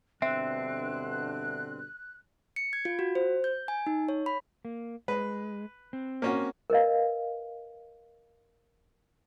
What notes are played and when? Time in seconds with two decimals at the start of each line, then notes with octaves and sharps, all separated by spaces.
0.22 G2 B2 D3 C4 E5 F#6
2.56 C#7
2.73 G#6
2.85 F4
2.99 F#4
3.15 C5
3.44 G6
3.68 G#5
3.87 D#4
4.09 C#5
4.26 B5
4.65 A#3
5.08 G#3 B4
5.93 C4
6.22 A#3 C#4 F#4
6.70 A#4 B4 D#5 F5